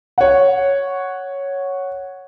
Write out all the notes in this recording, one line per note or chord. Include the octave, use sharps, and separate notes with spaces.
C#5 F#5